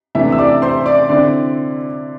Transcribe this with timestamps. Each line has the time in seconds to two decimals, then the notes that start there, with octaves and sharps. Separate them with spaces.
0.15 C3 E3 A3 D4 E4 E5
0.32 E6
0.39 D5 D6
0.62 C5 C6
0.86 D5 D6
1.09 D3 C4 E4 D5 D6